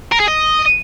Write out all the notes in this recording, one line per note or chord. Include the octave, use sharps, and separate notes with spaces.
A#4
G#4
D#5